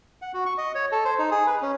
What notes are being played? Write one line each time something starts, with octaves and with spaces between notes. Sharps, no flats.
F#5
F#4
C#6
D#5
C#5
A4
C5
D#4
G#4
B4
C#4